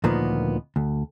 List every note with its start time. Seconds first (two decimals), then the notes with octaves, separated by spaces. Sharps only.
0.04 D2 A#2 D#3 F3 A#3 B3
0.76 D2